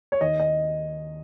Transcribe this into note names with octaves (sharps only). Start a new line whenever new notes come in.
C#5
D#2 D#5
D#5